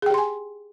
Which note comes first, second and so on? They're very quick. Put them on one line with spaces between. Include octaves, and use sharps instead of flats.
G#4 G5 G4 C6 G#5